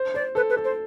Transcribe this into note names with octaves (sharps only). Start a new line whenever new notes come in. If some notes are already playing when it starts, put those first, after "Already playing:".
Already playing: C5
C5 D5
A4 B4
B4
A4
C5